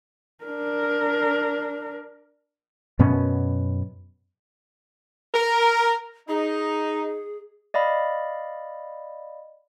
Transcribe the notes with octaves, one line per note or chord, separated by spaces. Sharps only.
D4 A#4
F#2 B2 B3 C#4
A#4
D#4 G#4
D5 D#5 F5 B5